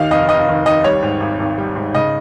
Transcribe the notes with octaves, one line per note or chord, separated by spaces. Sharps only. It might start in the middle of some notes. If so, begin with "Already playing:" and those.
Already playing: D#2 D#3 D#5 F5
F1 D#5
F1 D#5
D#3
D#2 D#5
G3 C#5
G#2
G#1
G#1
G3
G#2
C#3 D#5